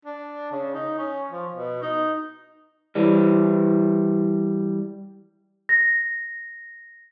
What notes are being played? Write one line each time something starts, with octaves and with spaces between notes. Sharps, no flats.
D4
C#3
D#4
C#4
F3
B2
D#4
E3 G3
A#6